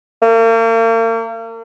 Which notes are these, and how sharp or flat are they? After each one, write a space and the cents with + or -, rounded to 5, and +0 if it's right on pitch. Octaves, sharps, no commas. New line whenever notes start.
A#3 -40